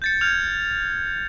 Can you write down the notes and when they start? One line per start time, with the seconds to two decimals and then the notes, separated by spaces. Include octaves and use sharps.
0.02 G6 A6 C#7
0.21 F6 G6 G#6 F7